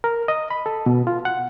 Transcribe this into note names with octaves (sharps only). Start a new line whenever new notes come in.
A#4
D#5
B5
A4
B2
F4
F#5